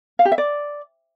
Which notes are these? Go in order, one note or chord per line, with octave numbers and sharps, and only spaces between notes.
F5
G4
E5
D5